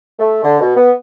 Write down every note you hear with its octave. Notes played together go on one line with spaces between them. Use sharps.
A3
D3
B2
B3